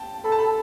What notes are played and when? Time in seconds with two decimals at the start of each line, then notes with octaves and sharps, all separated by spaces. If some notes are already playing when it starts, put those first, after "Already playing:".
Already playing: G5 A5
0.24 A4 B5
0.32 A5
0.39 B5